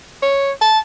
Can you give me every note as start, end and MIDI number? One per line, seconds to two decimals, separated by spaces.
0.22 0.52 73
0.61 0.79 81